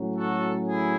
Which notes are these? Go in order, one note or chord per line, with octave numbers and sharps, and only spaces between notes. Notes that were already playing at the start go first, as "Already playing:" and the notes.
Already playing: A2 F#3 C#4
F#4 A4
E4 G#4